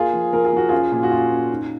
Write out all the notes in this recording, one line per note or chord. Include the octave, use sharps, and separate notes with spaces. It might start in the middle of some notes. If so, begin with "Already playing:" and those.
Already playing: A#3 F4 G#4
F3
F3 A#4
G#4
F3 F#4
C#4 F4 G#4
A#2
F#4
C#4 F4
C#4
D#4